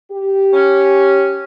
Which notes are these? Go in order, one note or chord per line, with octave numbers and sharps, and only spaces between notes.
G4
C#4